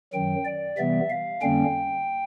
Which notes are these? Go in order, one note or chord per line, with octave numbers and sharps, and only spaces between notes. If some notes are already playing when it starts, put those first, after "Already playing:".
F#2 D#3 F#3 G5
D5
C3 E3 G3 B3 E5
F5
F2 D3 G3 A#3 C#4 G5